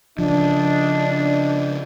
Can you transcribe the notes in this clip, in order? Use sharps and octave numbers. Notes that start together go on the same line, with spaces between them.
C#3 F3 D4 D#5